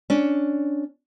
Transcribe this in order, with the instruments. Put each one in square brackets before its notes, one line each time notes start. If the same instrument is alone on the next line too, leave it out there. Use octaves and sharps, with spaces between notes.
[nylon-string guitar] C#4 D4